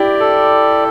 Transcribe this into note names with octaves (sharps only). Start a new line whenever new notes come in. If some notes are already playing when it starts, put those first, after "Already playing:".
Already playing: E4 G4 D5
A4